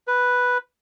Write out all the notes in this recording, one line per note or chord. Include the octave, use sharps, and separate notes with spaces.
B4